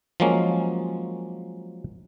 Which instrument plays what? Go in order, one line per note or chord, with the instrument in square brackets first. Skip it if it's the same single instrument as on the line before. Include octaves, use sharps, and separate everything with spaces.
[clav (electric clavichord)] F3 F#3 G#3 A#3 C#4